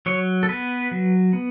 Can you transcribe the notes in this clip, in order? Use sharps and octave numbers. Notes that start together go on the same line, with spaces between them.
F#3 C#5
A4
B3 B4
F#3
B3